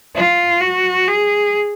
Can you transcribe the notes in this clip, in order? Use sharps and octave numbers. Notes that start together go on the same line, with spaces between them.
F4
F#4
G#4